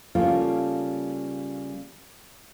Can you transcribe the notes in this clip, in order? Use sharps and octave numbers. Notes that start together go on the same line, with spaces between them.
C#3 G3 A#3 F4 A4